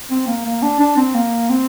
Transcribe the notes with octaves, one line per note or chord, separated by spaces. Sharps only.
C4
A#3
A#3
D4
D4
C4
A#3
C4